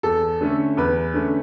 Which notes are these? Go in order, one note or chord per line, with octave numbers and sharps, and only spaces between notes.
E2 A4
D3 A3 C#4
E2 B4
D3 A3 C#4